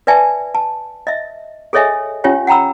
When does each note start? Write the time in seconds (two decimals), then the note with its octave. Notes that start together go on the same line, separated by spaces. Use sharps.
0.07 B4 D5 E5 G#5 A5
0.55 A5
1.07 D#5 E5
1.73 G#4 A4 C#5 D#5 E5 G#5
2.24 C#4 F4 G4 C#5 F5 G#5
2.47 F#5 G5 A#5 B5 E6